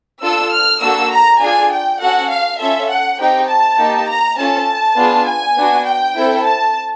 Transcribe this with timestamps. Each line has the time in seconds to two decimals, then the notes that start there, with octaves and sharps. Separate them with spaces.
0.22 D4 F4 A4 E6
0.52 F6
0.81 A#3 D4 F#4 A4 E6
1.11 A#5
1.40 D4 F4 G#4 G#5
1.70 G5
2.00 C#4 F#4 A4 F#5
2.29 F5
2.59 C#4 F4 A4 E5
2.89 F#5
3.19 C4 D#4 G4 G5
3.48 A5
3.78 A#3 D#4 G4
4.07 A#5
4.37 C#4 F4 A4 A5
4.96 B3 D4 F4 G#4
5.26 G#5
5.56 B3 D4 F#4
5.85 G5
6.16 C4 E4 A4
6.45 A5